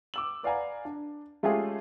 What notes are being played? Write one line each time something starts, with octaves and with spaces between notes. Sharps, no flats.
D6 E6 F#7
B4 D5 F5 F#5 G#5 A#5
D4
G#3 A3 C#4 F4 G4 G#4